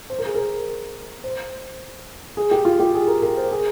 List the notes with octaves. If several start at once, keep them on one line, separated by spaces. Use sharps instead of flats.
C5
A#4
G#4
A#4
C5
G#4
G4
F4
G4
G#4
A#4
A#4
C5
G#4